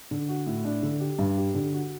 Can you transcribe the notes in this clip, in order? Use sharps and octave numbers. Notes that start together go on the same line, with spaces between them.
D3
F#4
A2
D4
D3
G4
G2
G4
D3
F#4